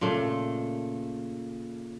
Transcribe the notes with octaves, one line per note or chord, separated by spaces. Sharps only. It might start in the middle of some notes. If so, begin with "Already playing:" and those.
A#2 C#3 A3